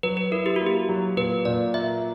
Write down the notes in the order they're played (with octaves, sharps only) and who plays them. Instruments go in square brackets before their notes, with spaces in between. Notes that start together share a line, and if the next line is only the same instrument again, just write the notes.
[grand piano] F#3 [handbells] B4
[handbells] B4
[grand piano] E4 [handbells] A#4
[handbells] G4
[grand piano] A#3 [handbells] F#4
[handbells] G4
[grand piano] F#3
[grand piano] A#2 [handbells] B4
[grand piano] A#2 [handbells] D5
[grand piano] A#3 [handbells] E5